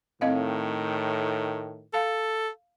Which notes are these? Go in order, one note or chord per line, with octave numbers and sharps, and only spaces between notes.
A2 D#3 C4 D#5 F5
A4 F5 A5